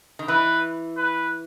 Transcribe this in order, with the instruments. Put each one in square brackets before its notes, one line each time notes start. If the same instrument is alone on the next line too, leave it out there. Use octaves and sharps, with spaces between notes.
[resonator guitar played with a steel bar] D#3
[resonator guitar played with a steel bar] E3 [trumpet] B4
[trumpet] B4